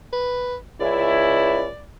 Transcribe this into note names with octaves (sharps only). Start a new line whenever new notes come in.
B4
C#2 C#4 E4 D5